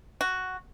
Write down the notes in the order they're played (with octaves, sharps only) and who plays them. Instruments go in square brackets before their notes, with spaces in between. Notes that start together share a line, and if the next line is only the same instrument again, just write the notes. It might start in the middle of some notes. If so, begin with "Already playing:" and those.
[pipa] F#4